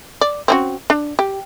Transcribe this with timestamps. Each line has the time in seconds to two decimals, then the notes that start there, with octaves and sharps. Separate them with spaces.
0.21 D5
0.48 C4 C#4 F#4
0.90 D4
1.19 G4